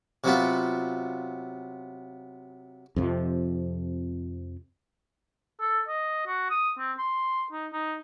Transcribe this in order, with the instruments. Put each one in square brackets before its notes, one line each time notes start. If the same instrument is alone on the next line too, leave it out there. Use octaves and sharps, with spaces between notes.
[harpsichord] C3 F#3 B3 F4
[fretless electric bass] F2 C3 F3
[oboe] A4
D#5
F#4
D#6
C4
C6
D#4
D#4